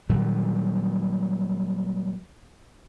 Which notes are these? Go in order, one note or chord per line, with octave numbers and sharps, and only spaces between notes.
A#2 D#3 F#3 G3